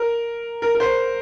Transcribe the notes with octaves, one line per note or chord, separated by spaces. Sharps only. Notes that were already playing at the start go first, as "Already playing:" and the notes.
Already playing: A#4
A#4
A#4
C5